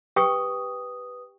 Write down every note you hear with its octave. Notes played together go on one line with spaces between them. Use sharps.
G4 B4 G5 C#6 D#6